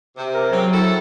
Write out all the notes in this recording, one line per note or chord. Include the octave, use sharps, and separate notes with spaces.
C3
A#4
C#3 F#3 C4
E4 A4